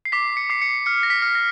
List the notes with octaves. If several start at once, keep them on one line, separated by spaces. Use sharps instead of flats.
C7
D6 B6
C#7
D6 C7
C#7
F6 C#7
A#6
B6
F6
A#6